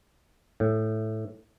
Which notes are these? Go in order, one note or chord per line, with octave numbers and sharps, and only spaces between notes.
A2